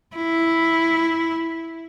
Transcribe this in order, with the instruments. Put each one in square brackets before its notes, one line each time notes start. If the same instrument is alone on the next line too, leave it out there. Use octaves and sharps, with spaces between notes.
[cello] E4